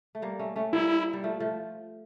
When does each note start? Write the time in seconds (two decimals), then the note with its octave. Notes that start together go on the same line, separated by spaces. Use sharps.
0.15 A3
0.22 G3 A#3
0.39 A3 C#4
0.56 A3 C#4
0.73 G3 A#3 E4
1.13 G3
1.24 F3 A3
1.40 F3 A3